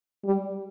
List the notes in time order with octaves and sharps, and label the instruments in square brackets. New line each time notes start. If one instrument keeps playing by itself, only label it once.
[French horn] G3